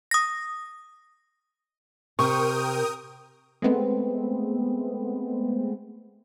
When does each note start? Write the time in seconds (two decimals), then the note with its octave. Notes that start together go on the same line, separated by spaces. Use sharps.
0.11 D#6 A#6
2.19 C3 A#4 G5 C#6 D#6
3.62 G#3 A3 B3 C4